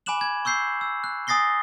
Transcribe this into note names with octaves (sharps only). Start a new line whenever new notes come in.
G#5 B5 D6 F#6 E7 F#7
G#6
C#6 E6 G6 C7
E6
F#6
G#5 D#6 A6 A#6 C7 G7